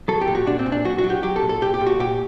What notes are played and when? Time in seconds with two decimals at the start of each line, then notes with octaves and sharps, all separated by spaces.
0.08 F#3 A4
0.21 G4
0.27 A#2
0.35 F#4
0.47 A#2 D4
0.59 C4
0.66 A#2
0.72 D4
0.85 F#3 F#4
0.98 F#4
1.04 F#3
1.10 G4
1.23 F#3 G4
1.36 A4
1.42 A#2
1.49 A4
1.61 A#2 G4
1.74 G4
1.81 A#2
1.86 F#4
1.99 A#2 G4